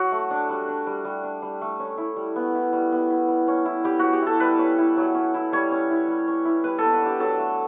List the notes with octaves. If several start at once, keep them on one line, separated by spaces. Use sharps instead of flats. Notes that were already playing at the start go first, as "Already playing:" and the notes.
Already playing: F#3 F#4
A3
D4
G3
D4
G3
G3
D4
G3
A3
C#4
E4
G3
B3
E4
G3
B3
E4
G3
C#4
E4
G3 G4
C#4 F#4
G4
E4 A4
G3 B4
C#4
E4
F#3
C#4
E4
G3 C#5
C#4
E4
G3
C#4
E4
G3 B4
B3 A4
B4
D4 G4
F#3 A4
A3